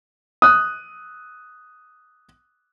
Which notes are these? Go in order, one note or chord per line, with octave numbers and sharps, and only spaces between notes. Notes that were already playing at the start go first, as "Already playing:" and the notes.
D#6 F#6